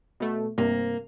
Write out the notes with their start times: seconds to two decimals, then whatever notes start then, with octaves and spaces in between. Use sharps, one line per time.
0.20 B2 A3
0.58 G2 C3 A#3